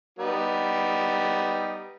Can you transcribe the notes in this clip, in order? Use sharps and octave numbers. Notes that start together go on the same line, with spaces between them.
G3 B3 D#4